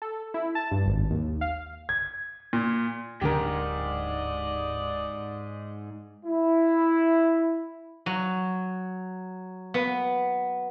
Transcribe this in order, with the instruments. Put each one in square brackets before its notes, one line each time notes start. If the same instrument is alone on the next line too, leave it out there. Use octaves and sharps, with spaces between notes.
[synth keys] A4
E4
A5
G2
G#1
D#2
F5
[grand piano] G#6
A#2
[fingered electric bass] D1 D3 D4 [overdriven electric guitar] G#2 [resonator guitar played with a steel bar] G4 A#4 [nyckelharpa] D5 D#5
[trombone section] E4
[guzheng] F#3
B3